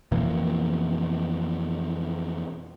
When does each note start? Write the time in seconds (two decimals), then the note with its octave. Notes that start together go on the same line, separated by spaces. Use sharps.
0.12 F2 B2 E3 A#3